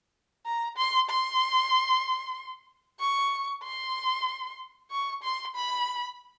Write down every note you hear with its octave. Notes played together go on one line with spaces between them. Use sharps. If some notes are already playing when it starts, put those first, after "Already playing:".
A#5
C6
C6
C#6
C6
C#6
C6
B5